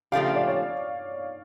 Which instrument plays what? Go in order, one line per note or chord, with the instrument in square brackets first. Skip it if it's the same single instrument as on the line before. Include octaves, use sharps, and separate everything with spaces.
[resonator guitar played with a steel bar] C#3 F3 A3 D4 G4 [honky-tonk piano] F5
[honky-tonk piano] D5
C#5